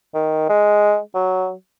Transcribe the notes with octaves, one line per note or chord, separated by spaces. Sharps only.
D#3
G#3
F#3